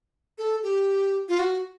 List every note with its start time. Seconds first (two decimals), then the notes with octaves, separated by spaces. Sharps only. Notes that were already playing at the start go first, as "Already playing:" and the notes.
0.38 A4
0.63 G4
1.29 F4
1.39 F#4